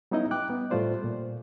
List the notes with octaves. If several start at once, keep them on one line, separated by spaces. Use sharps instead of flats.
G3 B3 C#4 D#4 E4 D#5
G3 G5 D6 F#6
B3
A2 G3 A3 F4 C5 D5
A#2